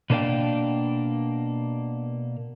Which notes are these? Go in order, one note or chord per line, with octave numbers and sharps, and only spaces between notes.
B2 A#3 D4 C#5 F5 G5